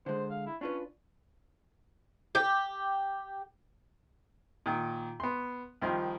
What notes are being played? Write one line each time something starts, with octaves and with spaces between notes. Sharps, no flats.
D3 G#3 C5
F5
E4
C#4 D4 F4 B4
G4
A#2 D#3
B3 C6
C2 D#3 F3 D#5 C6